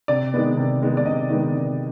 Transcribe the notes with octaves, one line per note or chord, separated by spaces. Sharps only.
C3 D5
D#3 G#3 B3
C3
D#3 G#3 B3
D5
C3 D#5
D#3 G#3 B3
C3